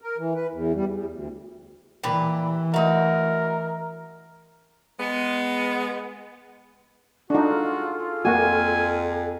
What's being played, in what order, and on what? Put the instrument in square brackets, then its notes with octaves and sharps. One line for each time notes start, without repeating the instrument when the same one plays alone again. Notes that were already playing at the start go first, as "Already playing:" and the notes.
[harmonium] A#4
E3
B4
E2
G3
E2
D2
[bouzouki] A#2 G4 B4 [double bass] E3
[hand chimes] A3 E5 [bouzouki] D#4 F#4 [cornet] A#4
[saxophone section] G#3 B3
[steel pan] D4 D#4 [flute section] F4 G#4 A4 [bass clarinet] F#4
[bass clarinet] F2 [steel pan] A#3 F#4 [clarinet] G#5